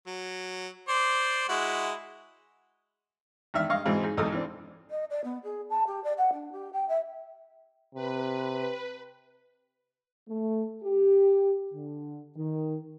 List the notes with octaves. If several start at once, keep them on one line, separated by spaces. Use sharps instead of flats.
F#3
C5 D5
G#3 E4 F#4
E2 D#3 D4 E5 F6
G2 D#5 F5 C#6
G#2 B2 E3 C4 E4 G#4
D#4 G#4
B1 E2 G#2 D#4 A4 D#6
E3 C4 D4
D#5
D5
B3
G#4
A5
G4
D5
F#5
D4
G4
G5
E5
C3 B4
A3
G4
D3
D#3